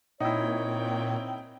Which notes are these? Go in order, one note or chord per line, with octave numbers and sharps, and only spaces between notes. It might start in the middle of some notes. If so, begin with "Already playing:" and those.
A#2 C4 D#4 E4 C#5 G5